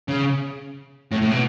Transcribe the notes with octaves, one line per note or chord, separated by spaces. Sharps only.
C#3
A2
A2
B2